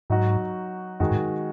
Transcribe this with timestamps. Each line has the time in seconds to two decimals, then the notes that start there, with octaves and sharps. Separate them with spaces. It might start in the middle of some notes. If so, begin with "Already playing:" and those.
0.10 G#2 F#3 D#4 F#4
1.00 F#2 D#3 G#3 F#4
1.11 G#2